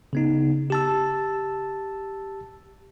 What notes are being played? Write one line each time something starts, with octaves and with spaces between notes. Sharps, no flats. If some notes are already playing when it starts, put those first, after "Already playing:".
C#3 B3 D#4
G4 A5 E6